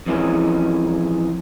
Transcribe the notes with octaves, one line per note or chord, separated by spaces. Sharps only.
F2 E3 G#3 C#4